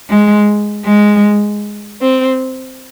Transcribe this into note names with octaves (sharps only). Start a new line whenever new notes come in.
G#3
G#3
C4